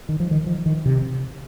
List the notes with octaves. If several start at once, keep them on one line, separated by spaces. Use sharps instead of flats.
D#3
F3
D#3
F3
D#3
C3